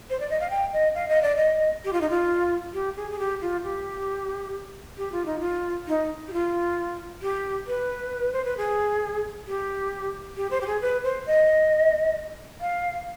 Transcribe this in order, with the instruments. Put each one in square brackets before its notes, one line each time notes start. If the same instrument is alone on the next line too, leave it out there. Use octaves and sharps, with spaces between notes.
[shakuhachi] C5
D5
D#5
F5
G5
D#5
F5
D#5
D5
D#5
G4
F4
D#4
F4
G4
G#4
G#4
G4
F4
G4
G4
F4
D#4
F4
D#4
G4
F4
G4
B4
C5
B4
G#4
G4
G4
C5
G4
G#4
B4
C5
D#5
F5